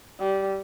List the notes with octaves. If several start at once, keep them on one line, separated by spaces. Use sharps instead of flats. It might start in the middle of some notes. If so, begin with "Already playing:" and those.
G3